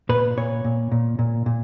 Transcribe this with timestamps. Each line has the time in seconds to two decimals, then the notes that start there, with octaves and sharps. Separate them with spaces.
0.09 A#2 B4
0.37 A#2 C#5
0.64 A#2
0.92 A#2
1.19 A#2
1.46 A#2